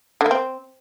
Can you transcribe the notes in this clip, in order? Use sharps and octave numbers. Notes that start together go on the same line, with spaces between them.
D3
A#3
C4